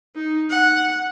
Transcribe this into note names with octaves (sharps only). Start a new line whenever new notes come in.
D#4
F#5